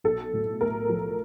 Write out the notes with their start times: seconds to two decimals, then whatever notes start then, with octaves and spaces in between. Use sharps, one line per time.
0.04 B1 A4
0.33 A2
0.61 A3 A#4
0.89 F3